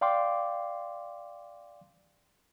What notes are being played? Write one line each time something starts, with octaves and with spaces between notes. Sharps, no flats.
D5 F5 G5 C6 D6